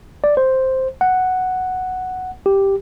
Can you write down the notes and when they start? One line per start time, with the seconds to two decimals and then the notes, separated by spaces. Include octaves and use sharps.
0.24 D5
0.37 C5
1.01 F#5
2.46 G4